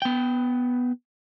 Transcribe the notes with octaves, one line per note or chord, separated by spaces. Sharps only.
B3 G5